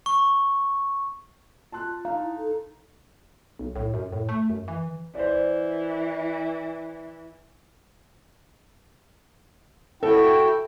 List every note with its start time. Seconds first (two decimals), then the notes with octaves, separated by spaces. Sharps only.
0.06 C#6
1.72 F4 A5 C6 F#6
2.05 D#4 F5
2.21 E4
2.37 A4
3.59 B1
3.76 A2
3.94 F#2
4.13 A2
4.29 A3
4.50 F#2
4.68 E3
5.15 E3 C5 D5
10.03 E4 F#4 A4 G5